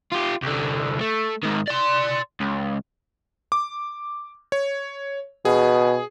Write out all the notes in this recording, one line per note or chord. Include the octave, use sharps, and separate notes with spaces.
F4 G4
C2 D3
A3
G#2 D#3
D5 C6
C#2
D6
C#5
B2 G#4